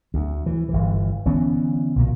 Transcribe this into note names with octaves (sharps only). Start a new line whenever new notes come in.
D2
E3
G1 E3
D3 E3 B3 C#4
B1 A#2 A#3